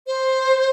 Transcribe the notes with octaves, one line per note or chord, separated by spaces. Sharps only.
C5